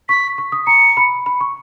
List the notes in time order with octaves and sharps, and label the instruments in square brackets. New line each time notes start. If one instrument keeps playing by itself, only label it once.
[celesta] C#6 [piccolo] B6
[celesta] C#6
D#6
[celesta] A#5 [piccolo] C#7
[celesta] B5
B5
C#6